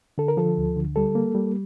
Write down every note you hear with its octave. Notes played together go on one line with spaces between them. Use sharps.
D3 A4
A#4
F3 A4
D2
D3
G3 A4
A#3
G3